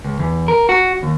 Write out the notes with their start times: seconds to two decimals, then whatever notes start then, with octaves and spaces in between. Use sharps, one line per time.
0.05 C#2
0.20 E2
0.48 A#4
0.69 F#4
1.03 D#2